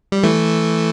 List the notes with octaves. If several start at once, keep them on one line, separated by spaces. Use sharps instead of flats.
G3
E3 A3